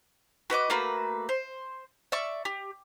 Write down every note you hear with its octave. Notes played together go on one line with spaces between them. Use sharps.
F#4 B4 D#5 D6
A3 A#3 F#4 B4
C5
D5 E5 C#6
G4